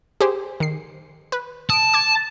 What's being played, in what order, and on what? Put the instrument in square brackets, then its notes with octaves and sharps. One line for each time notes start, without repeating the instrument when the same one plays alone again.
[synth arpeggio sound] G4 G#4 C5
D#3 C7
B4
[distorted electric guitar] A5 [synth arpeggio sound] D#6 D7
[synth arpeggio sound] D6 G#6